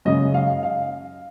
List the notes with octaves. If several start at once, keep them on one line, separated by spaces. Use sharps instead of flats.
F#2 C#3 G#3 D#5
F5
F5